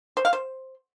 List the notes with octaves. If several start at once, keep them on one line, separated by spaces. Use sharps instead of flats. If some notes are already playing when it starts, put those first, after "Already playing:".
C5
F5
C5